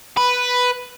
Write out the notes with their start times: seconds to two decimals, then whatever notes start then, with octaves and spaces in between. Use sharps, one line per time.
0.17 B4